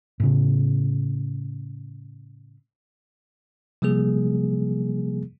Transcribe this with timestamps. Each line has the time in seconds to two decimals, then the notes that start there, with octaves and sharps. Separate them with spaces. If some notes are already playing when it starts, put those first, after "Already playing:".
0.20 A2 C#3
3.82 C3 F3 G3 A#3 G#4